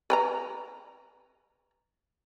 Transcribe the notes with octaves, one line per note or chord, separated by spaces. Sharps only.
B4 G5 A#5